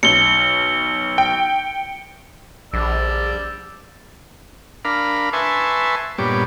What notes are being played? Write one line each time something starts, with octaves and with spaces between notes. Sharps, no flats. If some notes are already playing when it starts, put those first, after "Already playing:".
B1 C#7 G7
G5
A#1 G3 D5 E6
D4 A#4 F5 B5
B4 E5 G#5 A5 C6 C#6
G2 A#2 G3 B3 C#5 D6